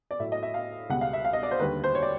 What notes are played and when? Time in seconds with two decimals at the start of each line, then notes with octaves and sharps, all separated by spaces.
0.11 D5
0.19 A2 F#3 E5
0.32 D#5
0.43 E5
0.54 F5
0.90 C#2 B2 G3 F#5
1.01 F5
1.13 E5
1.25 F5
1.33 D#5
1.43 D5
1.51 C5
1.60 D#2 D3 G3 B4
1.84 C5
1.95 C#5
2.03 D5